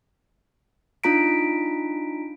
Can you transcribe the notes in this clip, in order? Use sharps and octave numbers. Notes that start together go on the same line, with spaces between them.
D4 D#4 F4 A#5 B6 D7